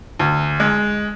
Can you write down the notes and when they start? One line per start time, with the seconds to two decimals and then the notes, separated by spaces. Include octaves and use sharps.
0.19 D2
0.60 G#3